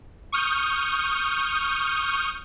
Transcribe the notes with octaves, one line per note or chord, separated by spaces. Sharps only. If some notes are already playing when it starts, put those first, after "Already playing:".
C#6 D#6 F6 G6